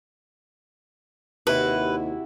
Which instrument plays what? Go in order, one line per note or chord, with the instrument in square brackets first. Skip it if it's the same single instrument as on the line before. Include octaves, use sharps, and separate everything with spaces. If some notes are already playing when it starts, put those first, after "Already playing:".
[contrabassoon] D#2 [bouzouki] C3 E4 F#4 [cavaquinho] B4